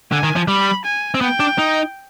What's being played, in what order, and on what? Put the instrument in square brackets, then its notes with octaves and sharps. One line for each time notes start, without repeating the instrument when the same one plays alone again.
[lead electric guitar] D3 [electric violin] G#5
[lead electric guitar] D#3
F3
[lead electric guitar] G3 [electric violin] B5
[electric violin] G#5
[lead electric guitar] C4
[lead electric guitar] B3 [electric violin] G5
[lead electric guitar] D4
D#4